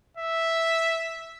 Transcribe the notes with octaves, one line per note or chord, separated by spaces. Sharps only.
E5